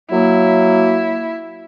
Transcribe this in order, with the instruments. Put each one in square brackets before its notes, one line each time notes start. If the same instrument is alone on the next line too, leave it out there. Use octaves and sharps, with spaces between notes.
[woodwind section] F#3 A#3 [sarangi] E4